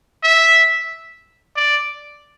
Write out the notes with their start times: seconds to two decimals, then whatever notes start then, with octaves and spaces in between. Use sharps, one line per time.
0.23 E5
1.56 D5